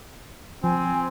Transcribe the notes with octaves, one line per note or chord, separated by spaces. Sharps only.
F3 C4 G#5